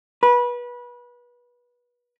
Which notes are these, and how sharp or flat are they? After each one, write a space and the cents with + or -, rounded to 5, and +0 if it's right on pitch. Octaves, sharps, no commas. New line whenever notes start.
B4 -25